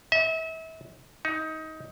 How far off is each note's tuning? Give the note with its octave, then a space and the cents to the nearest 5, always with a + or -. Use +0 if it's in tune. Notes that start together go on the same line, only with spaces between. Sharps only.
E5 -35
D#4 +20